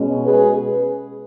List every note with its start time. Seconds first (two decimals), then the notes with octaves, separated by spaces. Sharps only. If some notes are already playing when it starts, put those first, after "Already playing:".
Already playing: B2 G#3 C#4
0.24 G#4 B4